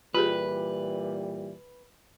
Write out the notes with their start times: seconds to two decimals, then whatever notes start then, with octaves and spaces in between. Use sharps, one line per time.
0.14 A#2 E3 G3 F4 G4 G#4 B4